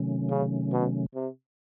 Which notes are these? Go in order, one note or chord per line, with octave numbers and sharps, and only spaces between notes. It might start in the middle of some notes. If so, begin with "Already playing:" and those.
Already playing: C3 D#3 F#3 A3 C#4
C#3
B2
C3